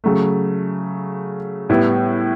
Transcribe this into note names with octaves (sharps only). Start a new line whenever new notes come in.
C#3 F#3 A3
A2 G3 B3 E4